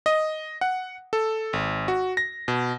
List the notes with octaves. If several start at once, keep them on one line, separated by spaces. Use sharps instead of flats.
D#5
F#5
A4
G#1
F#4
A#6
B2